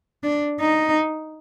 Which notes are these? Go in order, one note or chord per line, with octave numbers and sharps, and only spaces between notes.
D4
D#4